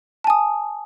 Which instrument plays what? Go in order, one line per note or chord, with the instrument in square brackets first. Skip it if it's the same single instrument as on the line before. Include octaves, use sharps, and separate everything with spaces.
[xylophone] A5
G#5
D#6